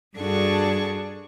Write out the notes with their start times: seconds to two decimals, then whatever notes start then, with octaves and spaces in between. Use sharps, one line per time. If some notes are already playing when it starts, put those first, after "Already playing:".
0.17 G2 D4 F#4 G#4 A4 C#6